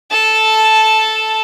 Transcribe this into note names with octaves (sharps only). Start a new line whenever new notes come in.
A4 A5